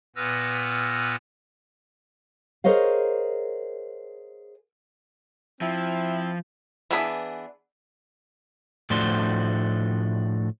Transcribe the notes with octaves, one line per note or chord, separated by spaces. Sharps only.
A#2 B3 B4 E6 F6 A#6
G#4 A#4 C5 C#5 D#5 F5
F3 C4 E4
E3 B3 D4 G#4 B5
A2 F3 A3 D4 F#4 C5